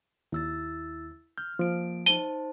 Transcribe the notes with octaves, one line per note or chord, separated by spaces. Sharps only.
D#2 E4 E6 A6
F6 G6
F3 A#3 D7
D#4 C5 A5 D#7 G7